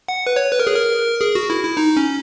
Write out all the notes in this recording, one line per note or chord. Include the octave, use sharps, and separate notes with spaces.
F#5
B4
C#5
B4
A#4
G#4
A#4
G#4
F#4
E4
E4
D#4
C#4